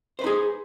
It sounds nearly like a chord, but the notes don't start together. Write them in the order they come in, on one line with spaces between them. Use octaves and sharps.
C5 B4 D#4 G#4